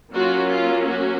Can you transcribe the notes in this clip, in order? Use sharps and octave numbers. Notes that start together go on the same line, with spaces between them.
F#3 A#3 C#4 F4 F#4
F4
F#4